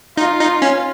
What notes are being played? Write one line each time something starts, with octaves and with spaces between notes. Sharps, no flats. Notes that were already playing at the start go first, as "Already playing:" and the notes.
D#4 F4
D#4
C#4